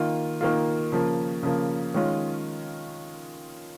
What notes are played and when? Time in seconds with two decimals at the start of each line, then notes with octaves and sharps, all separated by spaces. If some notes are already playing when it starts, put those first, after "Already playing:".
Already playing: D#3 A#3 F4
0.41 D#3 A#3 F4
0.92 C#3 F3 A#3
1.43 C#3 F3 A#3
1.94 D#3 G#3 C#4 F4